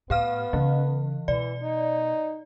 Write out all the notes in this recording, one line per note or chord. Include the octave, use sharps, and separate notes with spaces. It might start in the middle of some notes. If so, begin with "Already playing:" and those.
A2 B3 G4 F5 F6
C#3 E3
B2 E3 D5
D#4